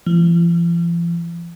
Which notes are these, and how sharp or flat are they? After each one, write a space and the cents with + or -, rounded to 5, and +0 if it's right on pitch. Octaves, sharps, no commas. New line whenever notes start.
F3 -45